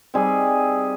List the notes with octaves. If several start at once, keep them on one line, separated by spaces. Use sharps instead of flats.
G3 C4 D#4 G#4